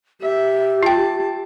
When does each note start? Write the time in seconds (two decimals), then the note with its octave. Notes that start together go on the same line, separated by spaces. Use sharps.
0.21 G4 E5
0.83 F4 G5 A5